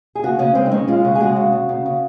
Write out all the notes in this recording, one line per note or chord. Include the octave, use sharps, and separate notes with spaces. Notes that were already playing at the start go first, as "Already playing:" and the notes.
G#4
C#3 F#4
C#3 C#4
G#3 C4
D#4
G#3 C#4
G#3 F4
C#3 F#4
G#4
G#3 F#4
C#3
C#3
C#3
C#3